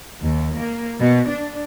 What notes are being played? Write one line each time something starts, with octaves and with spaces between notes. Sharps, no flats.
D#2
A#3
B2
D4